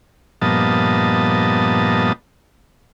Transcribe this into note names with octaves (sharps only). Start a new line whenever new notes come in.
G2 A#2 F3 B3 D#5 A5